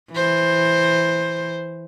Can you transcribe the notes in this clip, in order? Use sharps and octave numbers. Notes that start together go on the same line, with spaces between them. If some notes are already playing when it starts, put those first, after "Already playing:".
E3 C5